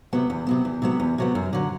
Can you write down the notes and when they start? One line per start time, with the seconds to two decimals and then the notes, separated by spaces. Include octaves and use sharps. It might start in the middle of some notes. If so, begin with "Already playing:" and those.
0.13 C3 F#3 B3
0.30 E2
0.47 C3 F#3 B3
0.65 E2
0.82 C3 F#3 B3
1.00 E2
1.18 C3 F#3 B3
1.35 F#2
1.53 D3 F#3